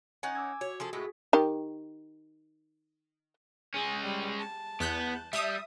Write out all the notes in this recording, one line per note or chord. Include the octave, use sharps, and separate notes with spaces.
C#4 D#4 F#5 G#5
D6 E6 G#6
F#4 C#5
F3 G#4 A4
A2 G#3 A3 F#4 G#4
D#3 G4
G#3 C#4 G#4
G3
A5
E2 B3 F#6 G6
G3 E5 D#6